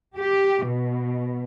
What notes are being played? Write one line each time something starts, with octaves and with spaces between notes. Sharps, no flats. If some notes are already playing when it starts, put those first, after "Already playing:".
G4
B2